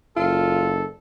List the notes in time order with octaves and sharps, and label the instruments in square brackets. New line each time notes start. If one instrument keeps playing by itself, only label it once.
[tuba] F#1 [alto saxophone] F4 [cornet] A4